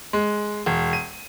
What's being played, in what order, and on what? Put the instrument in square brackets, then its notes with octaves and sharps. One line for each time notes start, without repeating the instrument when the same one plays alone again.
[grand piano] G#3
E1
D#7